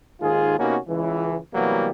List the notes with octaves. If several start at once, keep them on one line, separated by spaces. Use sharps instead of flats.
D#2 G#2 D#3 F4 G#4
C3 A#3 B3 C#4 D#4 F#4
C#2 E3
C3 E3 F#3 G3 A#3 B3